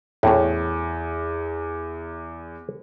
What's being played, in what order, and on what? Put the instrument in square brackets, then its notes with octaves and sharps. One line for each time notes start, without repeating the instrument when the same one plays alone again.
[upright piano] E2 [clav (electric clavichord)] A2 C#4